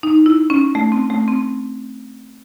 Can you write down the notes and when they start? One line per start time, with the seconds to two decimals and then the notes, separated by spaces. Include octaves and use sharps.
0.03 D#4
0.26 E4
0.50 C#4
0.75 A3
0.92 C4
1.10 A3
1.28 C4